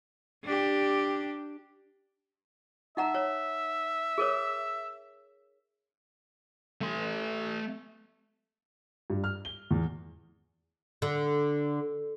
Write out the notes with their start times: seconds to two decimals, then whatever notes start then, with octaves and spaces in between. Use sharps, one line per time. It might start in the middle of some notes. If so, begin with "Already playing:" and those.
0.44 D4 G4
2.97 D#4 E5 F#5 A#5
3.15 C#5
4.18 G#4 A#4 C#5
6.81 A3 C6
9.10 G2
9.24 F6
9.45 G7
9.71 E2
11.02 D3